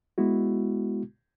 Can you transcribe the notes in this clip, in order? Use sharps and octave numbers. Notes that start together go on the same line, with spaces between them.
G#3 B3 E4 F#4